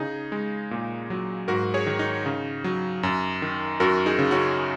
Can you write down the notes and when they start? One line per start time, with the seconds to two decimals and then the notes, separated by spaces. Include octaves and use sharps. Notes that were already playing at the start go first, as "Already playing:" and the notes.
Already playing: C#3 D#4 G#4
0.32 G#3
0.71 A#2
1.10 F#3
1.48 G#2 F#4 A#4
1.74 G#4 C#5
1.86 D#3
1.99 D#4
2.26 C#3
2.64 F#3
3.03 F#2
3.42 D#3
3.80 F#2 F#4 A#4
4.06 D#4 G#4
4.19 C#3
4.31 C#4 F#4